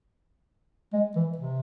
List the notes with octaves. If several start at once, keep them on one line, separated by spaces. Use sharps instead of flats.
G#3
E3
C3